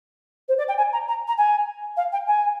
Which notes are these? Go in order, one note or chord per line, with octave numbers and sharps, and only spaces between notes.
C5
D5
G5
G#5
A#5
A#5
A#5
G#5
F5
G5
G#5